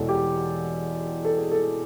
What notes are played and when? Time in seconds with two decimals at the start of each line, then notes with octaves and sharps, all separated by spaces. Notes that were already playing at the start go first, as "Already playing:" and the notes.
Already playing: E1 E2 B2 A4
0.09 G4
1.25 A4
1.38 G#4
1.51 A4